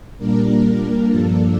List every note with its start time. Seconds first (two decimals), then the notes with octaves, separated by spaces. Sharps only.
0.18 A#2 G3 A#3 D4 A#4
0.62 A#4
1.07 G2 F3 A#3 D4 A4